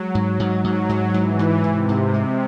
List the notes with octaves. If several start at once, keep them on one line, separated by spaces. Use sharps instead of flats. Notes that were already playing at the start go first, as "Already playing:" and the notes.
Already playing: F#3 G#3
G#2
G#2
G#2 F#3
G#2
G#2 E3
G#2
G#2 C3
G#2
G#3